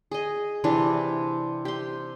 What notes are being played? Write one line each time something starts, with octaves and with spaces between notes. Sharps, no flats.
G#4 D#5
C3 E3 C4 D4
G4 C6